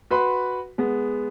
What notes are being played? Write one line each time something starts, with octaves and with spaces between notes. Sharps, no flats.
F#4 B4 B5 C6
G#3 B3